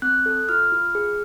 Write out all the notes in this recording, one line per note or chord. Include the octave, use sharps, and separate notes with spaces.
C4 F#6
A4
F4 F6
F4
G#4